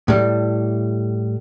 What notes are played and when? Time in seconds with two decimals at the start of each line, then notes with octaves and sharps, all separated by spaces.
0.08 A2 G3